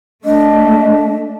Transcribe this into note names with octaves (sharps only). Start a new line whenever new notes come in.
A3 D4 D#5